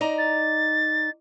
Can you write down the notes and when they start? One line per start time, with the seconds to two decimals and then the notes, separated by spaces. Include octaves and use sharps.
0.01 D#4 D5 A#5
0.18 A6